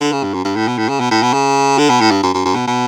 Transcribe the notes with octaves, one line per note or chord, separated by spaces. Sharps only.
D3
C#3
G2
F#2
G2
A2
B2
A2
C#3
B2
A2
B2
C#3
D3
B2
A2
G2
F#2
F#2
F#2
B2
B2